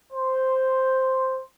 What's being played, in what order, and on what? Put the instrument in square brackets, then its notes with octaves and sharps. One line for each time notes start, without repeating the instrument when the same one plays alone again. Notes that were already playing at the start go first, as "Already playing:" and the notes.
[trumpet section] C5